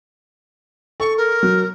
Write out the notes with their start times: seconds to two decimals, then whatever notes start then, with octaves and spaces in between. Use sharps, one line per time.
1.00 A4 C#6
1.17 A#4
1.43 F#3